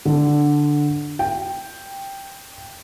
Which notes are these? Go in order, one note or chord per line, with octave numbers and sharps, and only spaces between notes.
D3
G5